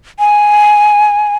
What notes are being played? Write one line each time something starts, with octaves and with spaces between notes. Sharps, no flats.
G#5